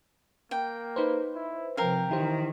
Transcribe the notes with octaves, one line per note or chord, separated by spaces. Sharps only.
A#3 G5
D#4 B4 C5
E4
C3 F3 A#4 F5 G5
D#3 E3 E4 G4 C5